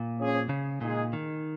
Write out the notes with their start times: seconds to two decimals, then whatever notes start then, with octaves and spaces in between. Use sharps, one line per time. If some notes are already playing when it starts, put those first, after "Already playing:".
Already playing: A#2
0.18 F3 C#4 G#4
0.49 C#3
0.81 A#2 G#3 D#4 G#4
1.13 D#3